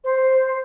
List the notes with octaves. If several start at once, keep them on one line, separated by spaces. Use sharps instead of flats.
C5